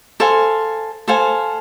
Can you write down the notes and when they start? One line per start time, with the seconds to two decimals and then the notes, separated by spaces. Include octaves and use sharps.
0.20 A4 C5 F5 G#5
1.08 A4 C5 F5 G#5